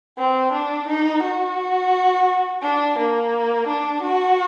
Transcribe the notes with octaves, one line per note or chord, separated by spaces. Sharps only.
C4
D4
D#4
F#4
D4
A#3
D4
F#4